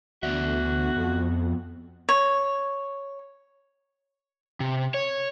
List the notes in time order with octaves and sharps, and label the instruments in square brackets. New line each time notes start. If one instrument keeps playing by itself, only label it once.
[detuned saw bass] D2 [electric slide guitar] B3 D5 E5 [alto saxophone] F#4
[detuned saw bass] F2
[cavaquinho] C#5
[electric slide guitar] C3
C#5